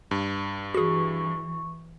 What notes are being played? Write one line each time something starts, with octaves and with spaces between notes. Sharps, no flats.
G2
E3 F#4 G#4 C#6